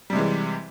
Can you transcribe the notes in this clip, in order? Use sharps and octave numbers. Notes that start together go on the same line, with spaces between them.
C3 E3 G3 G#3